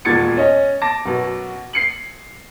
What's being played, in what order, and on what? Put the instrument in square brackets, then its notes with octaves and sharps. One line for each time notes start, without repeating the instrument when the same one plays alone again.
[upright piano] E1 D#2 A#2 G#6 A6 C#7
C#4 C#5 D#5
A5 D6 A#6
F#2 B2
C7 C#7 F#7